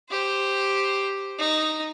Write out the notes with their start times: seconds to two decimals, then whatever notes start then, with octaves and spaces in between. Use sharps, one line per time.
0.10 G4 C5
1.38 D#4